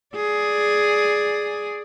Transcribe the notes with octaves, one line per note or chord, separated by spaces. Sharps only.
G#4 D5